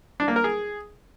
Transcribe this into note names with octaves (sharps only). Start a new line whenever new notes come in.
D4
A#3
A#4
G#4